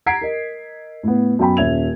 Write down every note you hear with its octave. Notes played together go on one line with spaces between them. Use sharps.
F#5 A#5 G#6 B6 C7 D7
A#4 D#5
A2 B3
F#2 B2 G5 B5
D#1 C#4 E5 G#6 F7